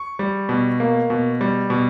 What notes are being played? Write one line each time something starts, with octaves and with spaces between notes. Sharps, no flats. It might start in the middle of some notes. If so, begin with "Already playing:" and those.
Already playing: C#6
G3
B2
A#3
B2
G3
B2